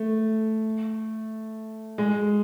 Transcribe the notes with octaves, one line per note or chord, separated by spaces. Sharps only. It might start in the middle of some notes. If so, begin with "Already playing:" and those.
Already playing: A3
G#3